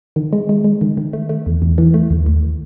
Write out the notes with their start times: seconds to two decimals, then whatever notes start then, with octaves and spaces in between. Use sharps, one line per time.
0.16 D#3
0.33 G#3
0.49 G#3
0.64 G#3
0.81 D#3
0.97 D#3
1.13 A3
1.29 A3
1.46 E2
1.62 E2
1.78 E3
1.94 A3
2.10 D#2
2.26 D#2